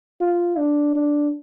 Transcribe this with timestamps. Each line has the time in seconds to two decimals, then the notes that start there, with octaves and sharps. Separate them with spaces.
0.21 F4
0.58 D4
0.95 D4